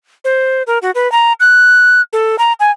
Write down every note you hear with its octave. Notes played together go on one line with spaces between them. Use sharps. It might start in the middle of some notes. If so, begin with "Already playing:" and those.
C5
A#4
F#4
B4
A#5
F#6
A4
A#5
G#5